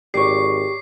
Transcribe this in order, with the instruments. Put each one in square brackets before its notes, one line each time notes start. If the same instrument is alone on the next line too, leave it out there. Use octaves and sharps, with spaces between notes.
[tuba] G#1 [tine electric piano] G4 C#6 [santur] C#5 D5 [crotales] C7